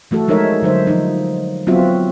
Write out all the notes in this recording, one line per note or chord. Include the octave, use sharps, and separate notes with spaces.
E3 A3 F#4 A4
F3 G#3 D#4 A#4 C#5 E5
D3 F#3 D#4 C5 E5
F3 D#4
F#3 B3 C4 F4 F#4 E5